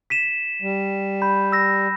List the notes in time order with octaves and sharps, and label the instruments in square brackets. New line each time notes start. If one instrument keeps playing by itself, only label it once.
[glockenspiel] B6 D#7 E7
[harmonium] G3
[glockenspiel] B5 G6
E6 A#6